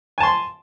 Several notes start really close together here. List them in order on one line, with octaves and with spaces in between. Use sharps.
G#5 A5 C6